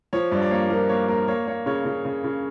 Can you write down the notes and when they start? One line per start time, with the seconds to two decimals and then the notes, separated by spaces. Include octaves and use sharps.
0.13 F3 C#5
0.31 G2 D5
0.41 D5
0.51 A#3 C#5
0.70 F3 A#4
0.89 A#3 C#5
1.08 A#3 A#4
1.28 A#3 C#5
1.47 A#3 C#5
1.66 C#3 C#5
1.85 C#3
2.05 C#3
2.24 C#3